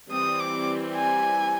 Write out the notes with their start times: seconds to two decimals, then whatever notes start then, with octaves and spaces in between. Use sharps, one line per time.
0.10 E3 G3 C4 D#6
0.40 D6
0.96 G#5